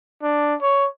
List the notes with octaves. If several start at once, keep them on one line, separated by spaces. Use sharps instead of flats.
D4
C#5